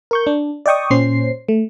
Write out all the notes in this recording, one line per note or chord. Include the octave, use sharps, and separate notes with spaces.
A#4 C#6 G6
D4
D5 D#5 G5 C#6 D#6
A#2 C#4 C5 C7
A3